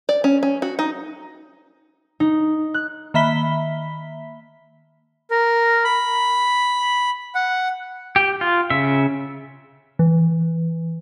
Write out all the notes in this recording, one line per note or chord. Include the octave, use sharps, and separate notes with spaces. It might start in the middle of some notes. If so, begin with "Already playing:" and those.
D5
C#4
C#4
F#4
D#4
D#4
F#6
D#3 A#3 E5 B5 B6 G7
A#4
B5
F#5
G4
F4
C#3 E5
E3